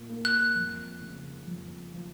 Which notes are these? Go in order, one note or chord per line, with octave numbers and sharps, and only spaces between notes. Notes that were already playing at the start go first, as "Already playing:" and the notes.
Already playing: A#2
A#3
F#6
F2
C#3
F2
F3